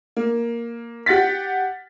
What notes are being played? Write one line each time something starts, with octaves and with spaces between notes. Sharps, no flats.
A#3
G4 F#5 A6 B6